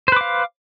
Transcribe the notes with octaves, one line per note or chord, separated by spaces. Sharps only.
B4 C5 F5 D6